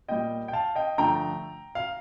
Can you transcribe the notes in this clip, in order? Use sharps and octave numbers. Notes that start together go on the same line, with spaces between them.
A#2 G3 D#5 G5
G5
F5 A5
D#5 G5
G2 D3 F3 A3 G5 A#5
F5